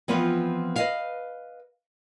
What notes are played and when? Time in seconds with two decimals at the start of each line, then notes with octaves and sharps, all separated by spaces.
0.08 E3 F3 B3 C4 F4 B4
0.76 B4 D#5 F5